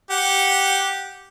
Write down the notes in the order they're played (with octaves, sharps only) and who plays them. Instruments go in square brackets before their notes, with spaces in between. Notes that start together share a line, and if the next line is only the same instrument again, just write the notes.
[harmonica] G4 F#5